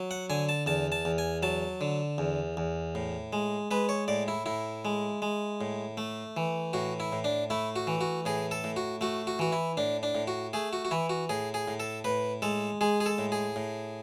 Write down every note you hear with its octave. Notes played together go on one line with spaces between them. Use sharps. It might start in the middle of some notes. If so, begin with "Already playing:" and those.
Already playing: F#3
F#5
D3 G#5
A5
E2 A5
A5
E2
G#5
F#3 A5
D3
E2
E2
A2
G#3
G#3 B4
C#5
A2 D5
E4
A2 E4
G#3
G#3
A2
A3
E3
A2 F#4
E4
A2
D4
A3 E4
F#4
E3
F#4
A2 G#4
A4
A2
F#4
A3 F#4
F#4
E3 F#4
E4
A2 D4
D4
A2
F#4
A3 G#4
F#4
F#4
E3 E4
F#4
A2 G#4
G#4
A2
A4
A2 B4
G#3 A4
G#3 G#4
G#4
A4
A2
G#4
A2